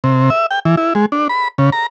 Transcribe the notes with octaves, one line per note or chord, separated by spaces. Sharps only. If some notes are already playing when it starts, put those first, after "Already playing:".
C3
E5
G5
E3
E4
G#3
D4
B5
C#3
A#5